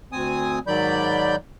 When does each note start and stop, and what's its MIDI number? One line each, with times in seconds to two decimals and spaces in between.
0.12 0.59 38
0.12 0.59 60
0.12 0.59 80
0.12 0.59 87
0.67 1.35 44
0.67 1.35 51
0.67 1.35 54
0.67 1.35 74
0.67 1.35 83
0.67 1.35 91